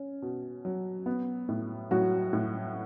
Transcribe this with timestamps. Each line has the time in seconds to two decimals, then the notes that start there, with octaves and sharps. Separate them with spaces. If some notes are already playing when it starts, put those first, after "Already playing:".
Already playing: C#4
0.22 B2
0.65 F#3
1.06 B3
1.49 A2
1.91 A2 F#3 F#4
2.33 A2